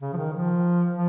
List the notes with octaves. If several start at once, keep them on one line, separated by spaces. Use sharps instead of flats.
C#3
F3
D#3
F3
F3